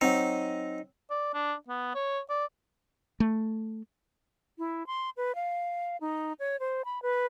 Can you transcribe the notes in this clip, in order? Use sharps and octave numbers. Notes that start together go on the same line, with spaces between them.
F#3 C4 D#4
D5
D4
B3
C#5
D5
A3
E4
C6
B4
F5
D#4
C#5
C5
B5
B4